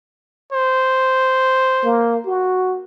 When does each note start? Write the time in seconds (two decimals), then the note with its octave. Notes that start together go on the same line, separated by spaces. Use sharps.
0.53 C5
1.84 A#3
2.26 F#4